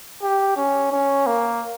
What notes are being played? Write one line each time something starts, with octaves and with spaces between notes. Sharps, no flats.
G4
C#4
C#4
A#3